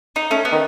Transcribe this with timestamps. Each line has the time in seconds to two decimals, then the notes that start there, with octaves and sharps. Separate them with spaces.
0.16 D#4
0.31 A3 C#4
0.45 B3
0.52 D#3